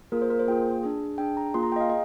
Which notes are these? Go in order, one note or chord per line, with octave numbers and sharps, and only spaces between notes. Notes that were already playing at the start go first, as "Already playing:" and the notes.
A#3 F4 G#4 A#4
C5
A#4
C5
A#3 F4 G#4 G5
D4 G#4
D4 G#4 G5
A#5
A#3 F4 G#4 C6
A#5
G5
D#5
F5
G#4 D#5